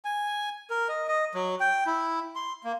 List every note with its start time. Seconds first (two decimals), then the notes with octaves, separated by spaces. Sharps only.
0.05 G#5
0.70 A#4
0.89 D#5
1.08 D#5
1.35 F#3
1.60 G5
1.86 E4
2.35 C6
2.64 A#3